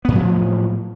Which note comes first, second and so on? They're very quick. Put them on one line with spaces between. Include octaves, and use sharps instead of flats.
B3 A2 F#3 F3